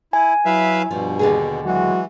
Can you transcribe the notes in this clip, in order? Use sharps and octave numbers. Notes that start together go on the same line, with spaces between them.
E4 G#5
F#3 E4 B4 E5 F5
G2 B2 F3
D#2 D3 G#4
E3 F#3 G#3 F#4